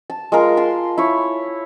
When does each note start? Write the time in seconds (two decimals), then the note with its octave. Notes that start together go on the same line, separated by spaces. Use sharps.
0.10 A5
0.32 G#3 F4 A#4
0.57 A5 C6
0.98 E4 C#5